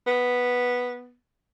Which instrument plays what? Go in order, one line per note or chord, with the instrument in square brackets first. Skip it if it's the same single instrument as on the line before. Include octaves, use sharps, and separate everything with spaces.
[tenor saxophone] B3